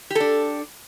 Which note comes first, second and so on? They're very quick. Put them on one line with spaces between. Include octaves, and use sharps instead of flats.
G4 A4 D4